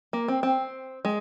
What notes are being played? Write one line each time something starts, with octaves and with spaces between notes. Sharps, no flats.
A#3
C4
C4
G#3